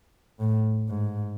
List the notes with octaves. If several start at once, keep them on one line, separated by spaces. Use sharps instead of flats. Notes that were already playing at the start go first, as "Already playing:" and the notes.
A2
G#2